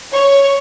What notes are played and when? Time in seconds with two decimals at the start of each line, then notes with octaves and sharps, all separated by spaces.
0.12 C#5